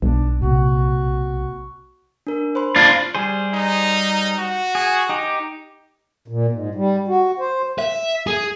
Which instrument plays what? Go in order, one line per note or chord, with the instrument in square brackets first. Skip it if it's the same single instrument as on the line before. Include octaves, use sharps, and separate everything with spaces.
[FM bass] B1 [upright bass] G#3 [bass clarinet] D4
[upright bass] A#1 C3 [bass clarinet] F#4
[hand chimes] D4 A#4
C5 B5 C6
[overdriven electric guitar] D4 F4
[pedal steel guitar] G3 G#4 C5
[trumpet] D#4
F#4
[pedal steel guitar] G#4
D#4 G4
[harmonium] A#2
G#2
G3
F#4
C5
[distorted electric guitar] E5
G#4